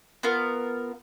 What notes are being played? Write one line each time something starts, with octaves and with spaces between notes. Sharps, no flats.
B3 F4 A#4